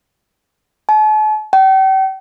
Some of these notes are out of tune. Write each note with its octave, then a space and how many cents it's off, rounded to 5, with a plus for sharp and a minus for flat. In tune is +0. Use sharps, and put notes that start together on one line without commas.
A5 -45
G5 -40